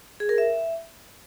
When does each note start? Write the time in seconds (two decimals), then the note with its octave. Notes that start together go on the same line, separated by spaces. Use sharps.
0.20 G#4
0.29 A#4
0.38 E5